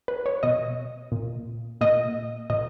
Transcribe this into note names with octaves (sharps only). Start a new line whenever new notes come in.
B4
C#5
B2 D#5
A#2
A#2 D#5
A#2 D#5